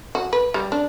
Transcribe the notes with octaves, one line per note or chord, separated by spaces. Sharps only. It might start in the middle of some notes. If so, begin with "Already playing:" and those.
F#4
B4
G3
D4